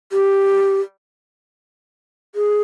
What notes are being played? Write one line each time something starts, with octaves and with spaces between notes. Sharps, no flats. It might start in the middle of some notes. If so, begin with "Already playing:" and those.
G4
G#4